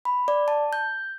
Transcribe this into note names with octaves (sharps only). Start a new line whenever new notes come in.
B5
D5
A5
G6